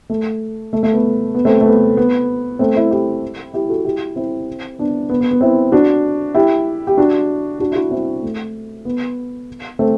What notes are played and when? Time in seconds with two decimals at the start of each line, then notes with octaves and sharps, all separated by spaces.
0.10 A3
0.73 A3
0.83 A3
0.93 B3
1.35 B3
1.45 A3 C4
1.61 A3
1.66 B3
1.97 B3
2.59 A3 C4
2.76 C4 E4
2.91 E4 G4
3.54 E4 G4
3.69 F#4 A4
3.85 E4 G4
4.16 C4 E4
4.79 B3 D4
5.10 B3
5.21 B3
5.31 B3
5.41 C4 E4
5.72 D4 F#4
6.35 E4 G4
6.87 G4
6.97 D4 F#4
7.60 D4 F#4
7.72 E4
7.76 D4 F#4
7.91 C4 E4
8.23 A3
8.85 B3
9.79 A3 C4